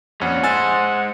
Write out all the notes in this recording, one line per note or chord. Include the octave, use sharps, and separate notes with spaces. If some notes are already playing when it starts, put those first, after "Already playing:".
F2 A#2 C#4 F#5
G#3 C5 G#5 E6 A6